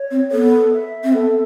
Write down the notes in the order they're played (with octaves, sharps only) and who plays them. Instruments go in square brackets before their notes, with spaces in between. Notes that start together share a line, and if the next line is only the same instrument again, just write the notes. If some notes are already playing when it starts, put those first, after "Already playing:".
Already playing: [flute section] C#5
[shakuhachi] C4
[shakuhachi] B3 [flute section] A4
[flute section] E5
[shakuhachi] C4
[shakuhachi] B3 [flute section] A4